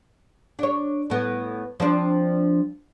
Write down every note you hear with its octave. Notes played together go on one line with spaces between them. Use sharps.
D4 C#5
A2 B3
F3 C4 D4